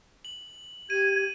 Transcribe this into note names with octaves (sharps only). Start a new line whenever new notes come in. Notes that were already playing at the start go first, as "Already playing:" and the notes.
F#7
G4 G#6 D#7